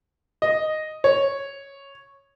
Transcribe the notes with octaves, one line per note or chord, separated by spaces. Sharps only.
D#5
C#5